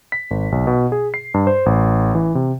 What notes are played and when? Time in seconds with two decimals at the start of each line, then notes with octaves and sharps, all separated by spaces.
0.12 B6
0.31 G#1
0.52 B1
0.67 B2
0.92 G#4
1.14 C7
1.34 G2
1.47 C5
1.66 A1
2.15 E3
2.35 C3